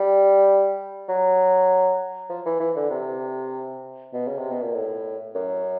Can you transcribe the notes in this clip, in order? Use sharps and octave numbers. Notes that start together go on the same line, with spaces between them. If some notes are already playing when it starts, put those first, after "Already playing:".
Already playing: G3
F#3
F3
E3
E3
D3
C3
B2
C#3
C3
B2
A#2
A2
F#2